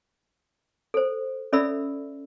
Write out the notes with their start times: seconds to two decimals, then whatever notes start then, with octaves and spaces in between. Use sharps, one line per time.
0.94 A4 C5
1.53 C#4 A4 D5 E5 B5 E6